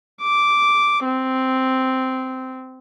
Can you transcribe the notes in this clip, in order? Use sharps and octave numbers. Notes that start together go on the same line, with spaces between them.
D6
C4